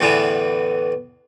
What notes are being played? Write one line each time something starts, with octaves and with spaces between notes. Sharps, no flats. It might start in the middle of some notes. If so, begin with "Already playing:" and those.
E2 A2 D3 E3